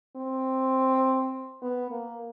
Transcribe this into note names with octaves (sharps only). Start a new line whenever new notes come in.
C4
B3
A#3